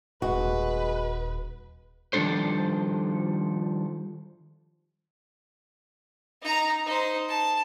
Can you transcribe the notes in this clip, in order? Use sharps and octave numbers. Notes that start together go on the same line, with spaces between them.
D#1 G#3 F#4 B4
D#3 F3 G3 D4 A4 C5
D#4 A#5
D#4 C5
A5